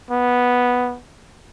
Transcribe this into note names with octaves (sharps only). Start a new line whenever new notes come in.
B3